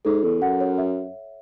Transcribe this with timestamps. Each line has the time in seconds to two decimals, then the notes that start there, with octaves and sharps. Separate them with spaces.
0.05 G#2 A4
0.23 E2 A4
0.42 F#2 F#5
0.60 C#5
0.78 E5